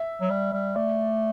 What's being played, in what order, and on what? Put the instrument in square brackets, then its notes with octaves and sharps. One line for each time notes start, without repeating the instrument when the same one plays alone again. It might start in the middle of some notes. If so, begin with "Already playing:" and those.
Already playing: [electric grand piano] E5
[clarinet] F#3
G3
G3
[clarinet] A3 [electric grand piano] D5